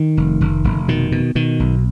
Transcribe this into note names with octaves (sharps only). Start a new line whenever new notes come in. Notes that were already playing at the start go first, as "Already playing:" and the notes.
Already playing: D#3
F1
F1
F1
B2 D#3
B2
B2 D#3
B1